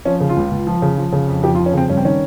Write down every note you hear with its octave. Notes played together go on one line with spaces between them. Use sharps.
F3 C#4
C#3
F4
C#2
C#2
F3
C#3
F3
C#3
F2
F2 G4
F4
F3
C#4
C#3 C4
G2 C#4
C4
D#3 C#4